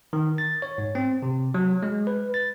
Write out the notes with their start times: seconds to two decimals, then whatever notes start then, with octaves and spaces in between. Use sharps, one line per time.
0.13 D#3
0.38 A6
0.62 C#5
0.78 G#2
0.95 C4
1.23 C3
1.54 F#3
1.83 G#3
2.07 B4
2.34 A6